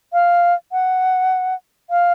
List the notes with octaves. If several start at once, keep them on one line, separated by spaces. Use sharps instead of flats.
F5
F#5
F5